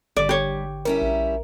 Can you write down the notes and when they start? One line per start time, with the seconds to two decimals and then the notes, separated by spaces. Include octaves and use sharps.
0.17 G#1 D3 G3 D5
0.29 G4 C#5
0.85 G3 C#4 E4 A#4
1.02 A#1